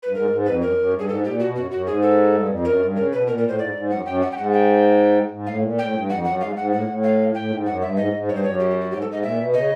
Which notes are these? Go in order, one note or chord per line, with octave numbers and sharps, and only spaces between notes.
B4
G2
G#2 A#4
G#2
F2 B4
F#2 A#4
F#2
G2
G#4
G#2 A4
A2
A#2 G4
B2 F#4
F#2 F#4
F#2 F#4
G#2 G#4
A4
G2
F2
F#2 A#4
G2
C#3 A#4
B2 B4
A#2 A#4
A#4
A2
C5
G#2 D5
G#2
F#2 F#5
F#2 G5
F#5
G5
G#2 F#5
G5
G#2
A2 F5
A#2
A2 G5
G2
F2 F#5
F#2 F#5
G#2 F5
G#2 F#5
A2 F#5
A2
F5
A2 G5
G#2
F#2 F#5
G2 E5
G#2 D#5
G#2
G2 C#5
C5
F#2 C#5
G4
G4
F#4
G#2 G4
A4
G#2 D#5
A#2 E5
B2
C#3 D#5